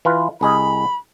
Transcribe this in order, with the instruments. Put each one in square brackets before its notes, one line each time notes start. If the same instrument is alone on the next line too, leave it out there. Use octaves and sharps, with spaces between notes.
[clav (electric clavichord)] E3 F4 B4
[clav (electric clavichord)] C2 G#4 D#5 [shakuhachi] B5